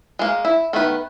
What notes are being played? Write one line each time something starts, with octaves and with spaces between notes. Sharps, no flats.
G#3 A#3
E4
D#3 A3 B3 B4